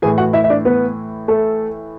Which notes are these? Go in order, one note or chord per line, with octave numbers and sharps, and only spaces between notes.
A2 E3 G#4 G#5
F#4 F#5
E4 E5
E5
D4 D5
B3 B4
A3 A4